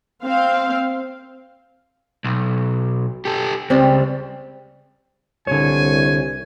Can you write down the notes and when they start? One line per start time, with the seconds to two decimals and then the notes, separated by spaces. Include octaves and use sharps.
0.23 C4 F5
2.24 B1
3.25 G4 A4
3.70 C#2 G3 C4
5.47 C2 D3 C#5 G#5